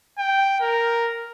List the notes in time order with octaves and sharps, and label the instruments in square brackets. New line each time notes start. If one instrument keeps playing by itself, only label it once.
[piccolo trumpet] G5
A#4